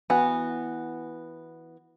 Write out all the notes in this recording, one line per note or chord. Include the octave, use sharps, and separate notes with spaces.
E3 B3 F#4